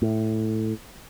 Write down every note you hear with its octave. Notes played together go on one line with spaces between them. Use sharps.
A2